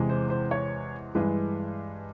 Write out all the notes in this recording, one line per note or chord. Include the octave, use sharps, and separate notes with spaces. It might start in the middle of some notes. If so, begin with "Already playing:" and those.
Already playing: E2 C3 E3 G#3
C5
C5
C#5
G2 E3 G#3 B4